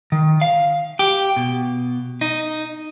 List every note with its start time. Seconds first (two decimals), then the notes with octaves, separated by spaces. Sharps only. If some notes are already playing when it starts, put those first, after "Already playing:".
0.12 D#3
0.42 F5
0.99 G4
1.36 B2
2.21 D#4